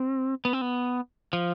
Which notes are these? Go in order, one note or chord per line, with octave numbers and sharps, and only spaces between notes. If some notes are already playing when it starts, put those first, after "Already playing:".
Already playing: C4
B3
C4
B3
F3